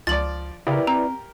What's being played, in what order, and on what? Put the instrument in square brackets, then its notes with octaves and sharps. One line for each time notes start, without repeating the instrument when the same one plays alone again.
[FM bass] C#2 [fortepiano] F3 D5 [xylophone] A6 F#7
[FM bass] C#3 [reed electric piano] E4 B4 D5 [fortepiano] G4 A#4
[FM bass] C4 [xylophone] A#5